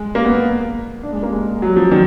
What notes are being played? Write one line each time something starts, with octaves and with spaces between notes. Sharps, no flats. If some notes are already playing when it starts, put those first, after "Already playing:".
Already playing: G#3
A#3
B3
D4
G#3
A#3
G#3
F#3
F3
D#3